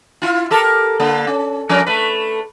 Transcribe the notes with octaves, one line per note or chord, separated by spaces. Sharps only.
E4 F4
G4 A4 A#4
D3 A#3
C#4
F3 C#4 A#4
A3 B4